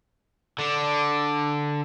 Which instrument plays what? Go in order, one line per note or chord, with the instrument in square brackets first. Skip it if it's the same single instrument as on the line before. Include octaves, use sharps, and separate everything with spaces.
[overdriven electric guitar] D3 D4